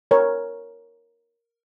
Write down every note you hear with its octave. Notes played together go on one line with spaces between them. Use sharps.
A#4 C#5